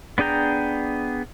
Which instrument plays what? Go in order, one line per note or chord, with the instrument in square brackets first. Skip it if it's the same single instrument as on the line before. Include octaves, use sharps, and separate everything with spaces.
[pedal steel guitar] B3 D4 G#4 G5 A#5